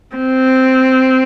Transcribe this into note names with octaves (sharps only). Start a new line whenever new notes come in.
C4